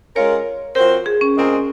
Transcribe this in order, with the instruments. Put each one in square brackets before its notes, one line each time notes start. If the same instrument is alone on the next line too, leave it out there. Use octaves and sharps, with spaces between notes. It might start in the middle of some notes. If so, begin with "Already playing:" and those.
[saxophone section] G#3 C#4 F4 A#4 [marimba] C#5
[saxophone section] F3 C4 F#4 C5 [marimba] A#4
[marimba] G#4
C#4
[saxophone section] A#2 G#3 C4 F4 A#4